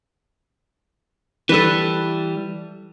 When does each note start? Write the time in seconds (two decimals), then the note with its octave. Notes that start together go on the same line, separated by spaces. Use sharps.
1.49 E3 G3 A4 B4